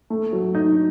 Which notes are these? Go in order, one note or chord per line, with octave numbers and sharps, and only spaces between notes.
A3
F#3
D#4